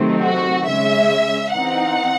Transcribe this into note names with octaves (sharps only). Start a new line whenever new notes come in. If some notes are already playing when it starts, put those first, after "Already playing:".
Already playing: C3 D#3 F#3 A3 C4
F#4
C#3 G#3 C#4 E5
E3 C4 D#4 F#5